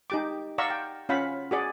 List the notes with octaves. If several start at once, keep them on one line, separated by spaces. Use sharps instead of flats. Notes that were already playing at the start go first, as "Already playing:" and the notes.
D#4 G4 D6
D5 F5 F#5 A#5 C#6 E6
G5
C#4 F4 F5 F#5 B5
F#4 G#4 D5